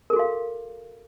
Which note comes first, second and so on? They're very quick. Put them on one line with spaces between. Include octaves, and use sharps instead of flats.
A#4 A4 F#4 F5